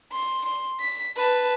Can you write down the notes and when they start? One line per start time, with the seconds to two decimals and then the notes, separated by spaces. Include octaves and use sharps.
0.12 C6
0.45 C6
0.80 B6
1.16 B4 A5